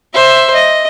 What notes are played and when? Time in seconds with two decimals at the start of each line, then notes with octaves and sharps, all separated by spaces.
0.14 C5 E5
0.54 D#5